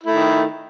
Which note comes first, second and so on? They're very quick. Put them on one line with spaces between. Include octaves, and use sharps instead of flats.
E4 A3 D#3